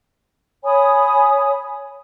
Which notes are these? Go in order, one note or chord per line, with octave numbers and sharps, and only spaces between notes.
C#5 G#5 B5 D#6